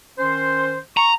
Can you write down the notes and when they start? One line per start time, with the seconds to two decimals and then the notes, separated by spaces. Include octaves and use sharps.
0.19 D#3 C#4 C5
0.97 A#5 C#6